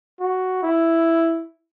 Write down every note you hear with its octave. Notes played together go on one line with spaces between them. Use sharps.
F#4
E4